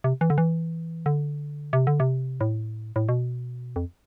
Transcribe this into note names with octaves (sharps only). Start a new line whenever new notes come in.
C3
E3
D3
E3
D3
C3
D3
C3
A2
A2
B2
F2